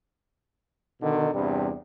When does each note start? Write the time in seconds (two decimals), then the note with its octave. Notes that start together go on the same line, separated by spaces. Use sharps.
1.01 B2 D3 D#3
1.34 E2 G2 C3 G3